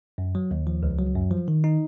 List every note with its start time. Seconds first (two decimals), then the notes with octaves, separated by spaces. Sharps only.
0.18 F#2
0.35 F#3
0.51 D#2
0.67 F3
0.83 C#2
0.99 F#3
1.15 F#2
1.31 F3
1.48 D#3
1.64 D#4